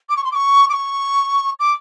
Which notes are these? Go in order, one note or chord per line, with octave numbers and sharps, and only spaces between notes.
D6
C#6
C6
D6
C#6
D6
C#6
D6